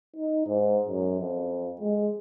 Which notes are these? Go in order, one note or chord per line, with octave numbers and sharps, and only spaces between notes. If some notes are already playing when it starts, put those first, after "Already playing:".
D#4
G#2
F#2
F2
G#3